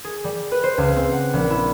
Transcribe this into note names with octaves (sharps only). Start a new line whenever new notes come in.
G#4
G3
B4
C5
C#2
C4
F#5
A#1
E4